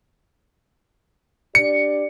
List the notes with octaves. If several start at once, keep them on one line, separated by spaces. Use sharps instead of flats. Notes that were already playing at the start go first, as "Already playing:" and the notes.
D4 G4 D5 C#7